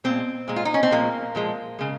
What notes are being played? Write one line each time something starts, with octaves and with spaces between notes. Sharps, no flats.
A#2 G#3 C4
A#2 G#3
F4
D#4
C#4
C4
A#2 F3 G#3 A#3
A#2 F3 G#3
C#3 G#3